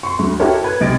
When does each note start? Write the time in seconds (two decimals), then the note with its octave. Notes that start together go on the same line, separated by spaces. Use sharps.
0.03 C6 C#6
0.19 D2 F#3
0.40 E4 F#4 G4 A4 A#4 C#5
0.64 B4 G#6
0.81 B1 C3 D#5 A6 D7